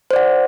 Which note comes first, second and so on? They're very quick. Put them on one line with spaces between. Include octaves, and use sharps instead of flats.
C5 D5 F#5